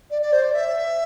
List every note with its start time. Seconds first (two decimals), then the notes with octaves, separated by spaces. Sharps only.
0.10 D5
0.21 D5
0.32 C5
0.42 D5
0.53 E5